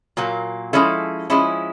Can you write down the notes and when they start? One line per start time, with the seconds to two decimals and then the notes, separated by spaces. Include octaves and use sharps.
0.17 A#2 F#3 A#3
0.73 F3 G#3 C#4 E4 A4
1.30 F3 G#3 C#4 E4